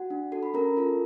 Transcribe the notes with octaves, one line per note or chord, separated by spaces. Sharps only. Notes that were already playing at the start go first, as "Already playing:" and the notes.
Already playing: F#4 F#5
D4
F#4 A4
B5
C#4 A#4 A#5
F4 A4